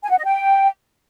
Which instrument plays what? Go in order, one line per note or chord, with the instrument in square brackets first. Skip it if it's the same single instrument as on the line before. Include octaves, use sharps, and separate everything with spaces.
[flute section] G#5
F#5
D#5
G5